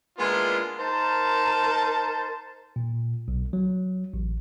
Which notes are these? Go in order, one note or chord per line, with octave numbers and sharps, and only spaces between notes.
G#3 A#3 B3 D4 E4 F4
D#4 A#4 C5 A5
A#2
B1
F#3
A1